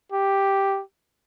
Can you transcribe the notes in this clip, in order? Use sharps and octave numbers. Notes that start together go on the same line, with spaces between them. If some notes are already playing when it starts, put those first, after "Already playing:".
G4